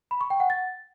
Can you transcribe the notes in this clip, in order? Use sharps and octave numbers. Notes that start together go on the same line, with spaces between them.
B5
C#6
G5
F#5
A6